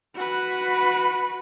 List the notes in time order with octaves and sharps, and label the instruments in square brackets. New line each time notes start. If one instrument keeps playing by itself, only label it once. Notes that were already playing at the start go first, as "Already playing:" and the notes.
[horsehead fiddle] F#4 B4